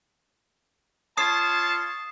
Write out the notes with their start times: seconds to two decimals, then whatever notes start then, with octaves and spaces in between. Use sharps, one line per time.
1.17 F4 C#5 A5 D#6 C7